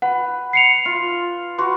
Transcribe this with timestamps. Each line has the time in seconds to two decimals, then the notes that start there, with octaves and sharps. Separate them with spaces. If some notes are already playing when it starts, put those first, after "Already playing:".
0.02 B4 F#5
0.53 C7 C#7 F7
0.85 F4
1.58 F#4 B4 C6